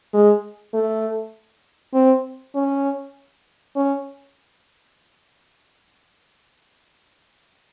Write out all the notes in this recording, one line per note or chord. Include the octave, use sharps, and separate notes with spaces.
G#3
A3
C4
C#4
C#4